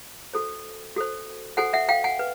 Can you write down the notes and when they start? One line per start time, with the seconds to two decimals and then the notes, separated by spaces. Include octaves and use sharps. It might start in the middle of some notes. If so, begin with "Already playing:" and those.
0.33 F#4 A4 C5
0.96 F#4 A4 C5
1.57 F#4 A4 C5 F#5 G#5
1.73 E5 F#5
1.89 F5 G5
2.04 F#5 G#5
2.19 B4